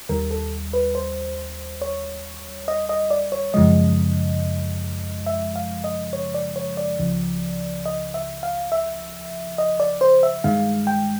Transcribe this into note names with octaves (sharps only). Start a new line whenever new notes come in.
D#2 D#3 G3 A#4
A4
B4
C5
C#5
D#5
D#5
D5
C#5
F#2 C#3 F3 G#3 D#5
E5
F5
D#5
C#5
D5
C#5
D5
C#2 C#3 F3
D#5
E5
F5
E5
D#5
D5
C5
E5
G2 D#3 G#3 F5
G5